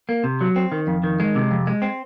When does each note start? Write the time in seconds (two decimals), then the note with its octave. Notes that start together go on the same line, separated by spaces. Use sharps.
0.09 A#3
0.24 C3
0.41 F#3
0.56 C4
0.72 D#3
0.87 F2
1.03 D#3
1.20 G#3
1.36 C3
1.51 F2
1.67 G#3
1.82 C4